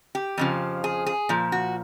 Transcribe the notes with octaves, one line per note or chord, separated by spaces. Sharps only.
G4
F2 C#3 F3
G#4
G#4
A#2 F3
F#4